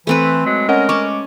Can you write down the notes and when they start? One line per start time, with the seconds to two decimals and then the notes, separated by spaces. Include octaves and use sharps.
0.07 E3 A3 C4 B4
0.46 F#3 G#3
0.69 C#4 A#4 D#5 F#5
0.89 C#4 A5 C#6 D6